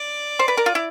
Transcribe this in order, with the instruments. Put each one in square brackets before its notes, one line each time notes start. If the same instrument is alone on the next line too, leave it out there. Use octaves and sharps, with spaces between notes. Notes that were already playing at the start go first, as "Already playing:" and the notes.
Already playing: [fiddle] D5
[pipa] C5
B4
A#4
F4
E4